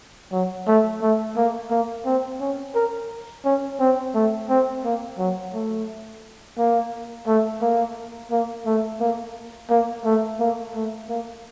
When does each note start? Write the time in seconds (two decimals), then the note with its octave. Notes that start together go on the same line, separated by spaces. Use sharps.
0.32 F#3
0.67 A3
1.02 A3
1.37 A#3
1.71 A#3
2.06 C4
2.41 C#4
2.75 A#4
3.45 C#4
3.80 C4
4.14 A3
4.49 C4
4.84 A#3
5.18 F#3
5.53 A3
6.58 A#3
7.27 A3
7.62 A#3
8.31 A#3
8.66 A3
9.00 A#3
9.70 A#3
10.05 A3
10.40 A#3
10.74 A3
11.09 A#3